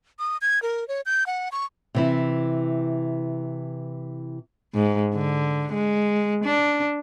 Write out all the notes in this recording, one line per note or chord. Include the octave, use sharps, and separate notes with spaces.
D#6
G#6
A#4
C#5
G6
F#5
C#6
C3 E3 E4
G#2
D3
G#3
D4